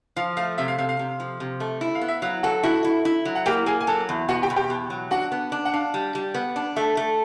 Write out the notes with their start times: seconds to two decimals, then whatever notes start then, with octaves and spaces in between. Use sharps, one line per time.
0.16 F3 F5
0.37 A3 F5
0.58 C3 E5
0.68 F5
0.78 C3 F5
0.89 F5
0.99 C3
1.20 F3
1.40 C3
1.60 A3
1.81 E4
1.95 F5
2.01 B3
2.08 E5
2.22 F#3 F5
2.43 F#4 A4 F#5
2.63 E4 F#4 F#5
2.85 E4
3.05 E4
3.25 F#3
3.35 F#5
3.46 A#3 G4 G5
3.66 A#3 G#4 G#5
3.81 G#5
3.87 F#3 A4 A5
4.09 E2
4.29 B2 F#4 F#5
4.42 G4 G5
4.50 E2
4.56 G4 G5
4.70 B2
4.90 F#3
5.11 D4 F#4 F#5
5.32 B3
5.52 D4
5.65 F#5
5.73 D4 F5
5.94 G3
6.15 G3
6.35 B3
6.56 D4
6.76 A3 E5
6.97 A3